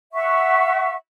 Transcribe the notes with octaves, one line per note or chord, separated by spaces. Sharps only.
E5 F#5 C#6